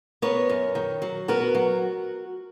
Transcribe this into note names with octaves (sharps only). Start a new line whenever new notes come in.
B3 A#4 C#5
F#2
D#3
F#3
B3 F#4 A#4
F#3